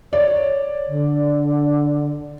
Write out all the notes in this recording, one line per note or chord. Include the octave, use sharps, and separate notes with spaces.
C#5 D5
D3